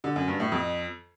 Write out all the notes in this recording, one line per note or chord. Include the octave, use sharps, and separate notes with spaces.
D3
F#2
G2
A2
F2